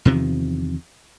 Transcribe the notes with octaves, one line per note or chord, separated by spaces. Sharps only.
E2 C3 D#3 F3